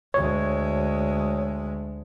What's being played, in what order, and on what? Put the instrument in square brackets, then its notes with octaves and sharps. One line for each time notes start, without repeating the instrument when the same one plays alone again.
[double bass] D2 G#3 [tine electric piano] C#5